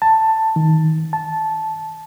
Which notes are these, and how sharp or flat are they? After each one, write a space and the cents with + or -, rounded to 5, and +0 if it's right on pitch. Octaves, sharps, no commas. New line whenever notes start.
A5 +10
D#3 +25
A5 -10